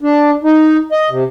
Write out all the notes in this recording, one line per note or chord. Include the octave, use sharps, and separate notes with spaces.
D4
D#4
D#5
C3